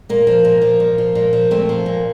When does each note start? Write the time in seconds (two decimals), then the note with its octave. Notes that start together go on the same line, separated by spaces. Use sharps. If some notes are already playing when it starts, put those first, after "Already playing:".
0.09 A#2 A#3
0.27 F3
0.45 A#2
0.62 F3
0.80 A#2
0.98 F3
1.15 A#2
1.33 F3
1.51 A#2 A3 C4
1.69 F3
1.86 A#2